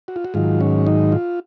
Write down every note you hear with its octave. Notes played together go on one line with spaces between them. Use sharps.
F#4
F4
F#4
G#2 D#3 F#3 F4
C#4
D#4
F4